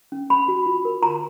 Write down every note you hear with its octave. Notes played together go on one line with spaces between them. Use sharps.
C#4
C#4 B5
F#4
F4
A#4
F4 A#5